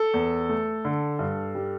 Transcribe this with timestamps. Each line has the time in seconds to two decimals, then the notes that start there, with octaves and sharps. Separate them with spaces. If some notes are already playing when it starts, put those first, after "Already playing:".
Already playing: A4
0.14 E2
0.49 A3
0.85 D3
1.19 G2
1.55 G3